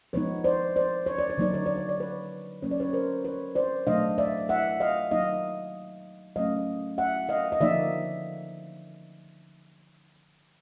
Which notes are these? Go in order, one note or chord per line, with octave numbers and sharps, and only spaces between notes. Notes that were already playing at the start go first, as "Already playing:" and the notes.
F3 G#3 B3 D#4 B4 C#5
C5 D5
C5 D5
C#5
D5
C#5
D3 F#3 A#3 D#4 D5
C#5
D5
C#5
D5
B4 C#5
F#3 A#3 C#4 C#5
D5
B4 C#5
A#4 C5
B4 C#5
C5 D5
B2 F#3 A3 D4 D#5 F5
D5 E5
E5 F#5
D#5 F5
F#3 A#3 D#4 D#5 F5
F#3 A3 C#4 D#5 F5
E5 F#5
D#5 F5
D#5
D3 F3 A#3 D#4 D5 E5